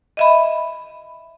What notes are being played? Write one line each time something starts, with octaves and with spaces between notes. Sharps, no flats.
D#5 E5 B5